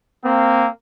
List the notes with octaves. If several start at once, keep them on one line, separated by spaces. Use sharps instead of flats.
A#3 C4